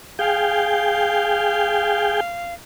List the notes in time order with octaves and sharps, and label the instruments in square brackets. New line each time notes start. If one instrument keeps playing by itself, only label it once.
[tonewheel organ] G#4 G5 [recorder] F5